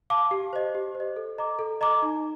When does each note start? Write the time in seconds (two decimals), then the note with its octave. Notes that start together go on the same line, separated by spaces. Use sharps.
0.10 F5 A5 D6
0.31 G4
0.53 C5 D#5
0.75 G4
0.95 C5
1.00 D#5
1.16 A4
1.38 D#5 A#5 D6
1.59 A4
1.81 D#5 A#5 D6
2.02 D#4